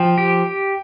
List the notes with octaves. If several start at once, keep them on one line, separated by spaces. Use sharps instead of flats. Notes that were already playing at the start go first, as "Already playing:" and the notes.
Already playing: F3 G5
G4